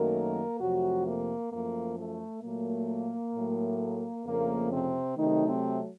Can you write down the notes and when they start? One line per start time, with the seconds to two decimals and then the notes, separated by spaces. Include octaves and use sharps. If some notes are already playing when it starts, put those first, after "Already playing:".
Already playing: F#2 D#3 F#3 A3 A#3 A#4
0.61 F2 C3 F3 F#3 A3 F#4
1.07 A#3
1.52 F#2 F3 A3 A#3
1.98 A3
2.43 A#2 F#3 A3 A#3
3.35 A2 F#3 A3
4.26 F2 C#3 F3 A3 A#3
4.71 C3 C4
5.17 C3 D#3 F#3 A3 D#4
5.47 C3 C4